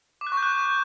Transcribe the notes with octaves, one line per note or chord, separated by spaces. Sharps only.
D6
F#6
C#6
G6
F#6